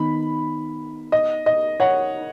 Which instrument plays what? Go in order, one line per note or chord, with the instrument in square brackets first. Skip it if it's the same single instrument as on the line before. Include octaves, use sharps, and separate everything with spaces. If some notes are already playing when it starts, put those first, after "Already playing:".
Already playing: [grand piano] D#3 B3 D#4 [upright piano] B5
[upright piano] D#5
D#5
C#5 F#5